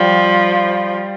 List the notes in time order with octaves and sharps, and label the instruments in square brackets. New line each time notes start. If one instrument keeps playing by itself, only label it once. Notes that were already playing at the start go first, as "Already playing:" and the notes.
Already playing: [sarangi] F3 [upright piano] G3